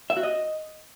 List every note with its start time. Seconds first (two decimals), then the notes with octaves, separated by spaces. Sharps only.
0.10 E5
0.17 F#4
0.23 D#5